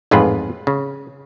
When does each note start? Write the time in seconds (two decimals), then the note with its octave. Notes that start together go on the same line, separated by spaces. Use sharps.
0.11 A1 F2 G#2 F4 G#4 B4
0.67 C#3